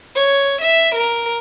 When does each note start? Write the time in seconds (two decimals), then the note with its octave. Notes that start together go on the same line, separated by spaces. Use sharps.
0.15 C#5
0.61 E5
0.95 A#4